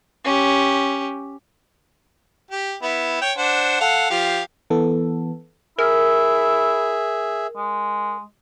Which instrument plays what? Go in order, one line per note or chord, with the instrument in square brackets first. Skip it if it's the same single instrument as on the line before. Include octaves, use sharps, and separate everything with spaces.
[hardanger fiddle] C#4 G4
[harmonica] G4
B3 E4
C#5 G5
D4 C5 F#5
A4 F5 F#5
F3 G4 F5
[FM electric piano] E3 B3 A4
[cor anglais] E4 [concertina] G#4 E5 [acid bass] A#4
[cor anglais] G#3